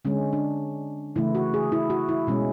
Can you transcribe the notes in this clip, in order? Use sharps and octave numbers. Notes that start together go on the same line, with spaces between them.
D3 G#3 C#4
D4
C#3 E3 A3 E4
F#4
G#4
E4
F#4
E4
B2 G#3 C#4